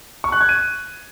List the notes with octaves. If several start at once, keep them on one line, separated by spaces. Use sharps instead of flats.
C#6
F#6
G#6
D#7